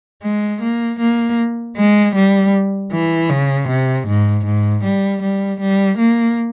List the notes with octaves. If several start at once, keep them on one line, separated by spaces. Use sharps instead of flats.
G#3
A#3
A#3
G#3
G3
E3
C#3
C3
G#2
G#2
G3
G3
G3
A#3